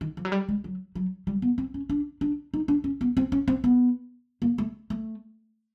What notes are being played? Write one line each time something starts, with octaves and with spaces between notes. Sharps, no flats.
D#3
F3
F#3
G3
G#3
F#3
F#3
G3
B3
C4
C#4
D4
D4
D#4
D4
C#4
B3
C4
C#4
C4
B3
A#3
A3
A3